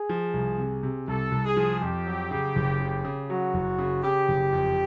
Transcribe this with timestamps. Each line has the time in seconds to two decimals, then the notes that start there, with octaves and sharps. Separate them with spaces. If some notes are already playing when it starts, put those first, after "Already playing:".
Already playing: G#4
0.09 F3
0.34 C2
0.58 C3
0.83 C3
1.08 C2 A4
1.32 C2
1.44 G#4
1.57 F3
1.81 F2 G4
2.07 F#3
2.31 C#3
2.56 F#1
2.80 C#3
3.05 C#3
3.29 F#3 F#4
3.54 F#1
3.78 C#3
4.03 C#3 G4
4.28 F#1
4.52 F2